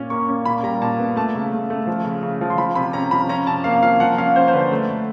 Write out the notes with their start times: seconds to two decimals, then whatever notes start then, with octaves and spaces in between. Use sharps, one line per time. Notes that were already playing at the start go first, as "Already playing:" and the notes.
Already playing: A#2 C#4
0.10 A#3 C#6
0.29 C#4
0.45 A#2 B5
0.63 G3 A#5
0.82 A#2 A5
0.99 B3
1.16 A3 A5
1.35 C#3
1.53 A3
1.70 A3
1.87 F3
2.05 C#3
2.23 C#3
2.41 F3
2.50 C6
2.58 F3 B5
2.75 C3 B5
2.93 C#4 A#5
3.11 F3 B5
3.29 C#4 A#5
3.47 C3 A5
3.64 A#3 F5
3.83 F3 F5
4.00 F3 F#5
4.18 C#4 F5
4.36 C#4 C5
4.48 C5
4.53 D3 B4
4.72 A3
4.89 A3